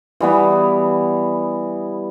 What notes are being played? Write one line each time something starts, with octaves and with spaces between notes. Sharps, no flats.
E3 G3 B3